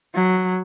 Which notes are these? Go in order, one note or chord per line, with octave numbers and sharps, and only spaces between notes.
F#3